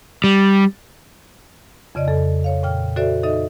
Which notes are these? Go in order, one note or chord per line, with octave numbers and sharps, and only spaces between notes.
G3
F2 C#3 D5 D#5
F2 A4
C#5 F5
A#2 G5 F6
F#4 A4 C5 D5 E5
D#4 A4 D#5 E5